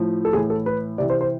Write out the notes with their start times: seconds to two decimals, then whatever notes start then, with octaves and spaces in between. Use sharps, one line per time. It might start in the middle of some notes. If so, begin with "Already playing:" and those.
Already playing: A2 F3
0.25 A4
0.33 A2 E3 G#4
0.50 A4
0.66 B4
0.98 C3 E3 D5
1.10 C5
1.21 C5